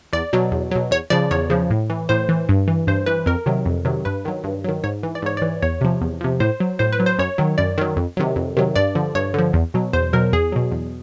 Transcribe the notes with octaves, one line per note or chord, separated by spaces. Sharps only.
E2 D5
B2 F#3
E2
B2 F#3
E2 C#5
C#3 F3 D5
E2 C#5
C#3 F3
A2
E3
A2 C5
E3
G2
E3
G2 C5
E3 B4
F2 A#4
C3 D#3 F#3
F2
C3 D#3 F#3
G2 B4
D#3 F#3
G2
D#3 F#3
G#2 C#5
E3
D5
G#2 C#5
D5
E3
E2 C#5
C3 F3
E2
C3 F3
A2 C5
F#3
A2 C5
B4
F#3
C5
F#2 C#5
D#3 F#3
F#2 D5
D#3 F#3
F2
C3 D#3 F#3
F2
C3 D#3 F#3
G2 D5
D3 F3
G2 C#5
D3 F3
E2
B2 F#3
E2 C5
B2 F#3 A#4
E2 G#4
B2 F#3
E2